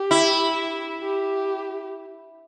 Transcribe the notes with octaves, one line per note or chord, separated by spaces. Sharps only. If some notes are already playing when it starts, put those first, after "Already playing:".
Already playing: G4
E4
G4